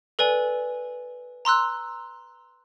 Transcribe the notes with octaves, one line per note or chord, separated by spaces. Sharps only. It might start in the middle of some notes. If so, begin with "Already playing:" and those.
A4 B4 D5 G#5
A#5 C6 E6 F#6